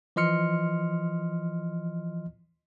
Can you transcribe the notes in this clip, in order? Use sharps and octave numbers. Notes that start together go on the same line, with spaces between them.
E3 F3 D#5 C6 F6 C#7